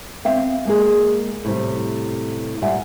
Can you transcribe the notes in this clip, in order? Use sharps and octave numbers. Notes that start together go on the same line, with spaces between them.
C4 E5 F5 G5
G#3 A#3 G#4
A2 C3 G3
A#2 G3 D5 E5 F#5 G#5